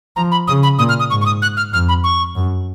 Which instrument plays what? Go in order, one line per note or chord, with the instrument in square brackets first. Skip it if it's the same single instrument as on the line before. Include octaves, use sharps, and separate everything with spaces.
[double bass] F3 [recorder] A#5
[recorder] B5
[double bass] C#3 [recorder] D#6
[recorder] B5
[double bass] A#2 [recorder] D#6
[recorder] F6
D#6
[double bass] G#2 [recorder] C#6
[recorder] C#6
D#6
F#6
F6
[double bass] F2 [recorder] F6
[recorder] B5
C#6
[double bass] F#2